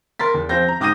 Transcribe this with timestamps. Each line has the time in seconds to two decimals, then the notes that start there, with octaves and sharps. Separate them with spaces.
0.19 A#4 C6 A6 B6
0.34 E2
0.49 F3 C4 G6 A#6
0.68 A#5
0.80 G#2 D6 D#6 G6 A#6 D#7